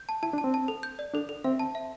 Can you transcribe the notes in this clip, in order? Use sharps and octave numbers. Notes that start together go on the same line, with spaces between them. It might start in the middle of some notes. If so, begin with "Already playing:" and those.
Already playing: G6
A5
E4 A5
D4
A5
C4
A5
A4
G6
D5
D4 A4
A4
C4 E5
A5
E5